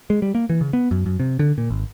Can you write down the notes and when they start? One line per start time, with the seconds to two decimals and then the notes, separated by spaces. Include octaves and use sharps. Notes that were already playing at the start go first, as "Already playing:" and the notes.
0.10 G#3
0.22 G3
0.35 A#3
0.50 E3
0.61 C#3
0.73 B3
0.91 F#2
1.06 F#2
1.20 C3
1.39 D3
1.58 A#2
1.70 G#1